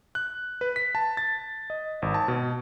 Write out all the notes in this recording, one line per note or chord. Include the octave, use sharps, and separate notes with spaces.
F#6
B4
B6
A5
A6
D#5
G#1
A5
B2